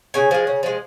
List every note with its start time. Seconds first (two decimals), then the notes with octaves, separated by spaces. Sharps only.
0.14 C#3 G#5
0.31 F3 G#3
0.47 C#3
0.63 F3 G#3